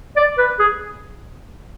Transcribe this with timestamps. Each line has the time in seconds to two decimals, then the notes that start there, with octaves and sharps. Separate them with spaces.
0.16 D5
0.38 B4
0.59 G#4